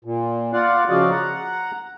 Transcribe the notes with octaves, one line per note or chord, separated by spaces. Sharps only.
A#2
F4 D5 F5 F#5
C#3 F3 F#4 D5 D#5 F5
F#5 A#5